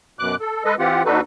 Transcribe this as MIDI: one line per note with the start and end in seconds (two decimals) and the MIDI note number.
0.19 0.36 42
0.19 0.36 47
0.19 0.36 86
0.19 0.36 90
0.41 0.64 69
0.65 0.75 56
0.65 0.75 69
0.65 0.75 71
0.65 0.75 75
0.79 1.03 52
0.79 1.03 60
0.79 1.03 65
0.79 1.03 67
0.79 1.03 78
1.05 1.21 39
1.05 1.21 62
1.05 1.21 63
1.05 1.21 66
1.05 1.21 69
1.05 1.21 71